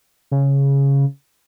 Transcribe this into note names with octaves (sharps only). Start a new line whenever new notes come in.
C#3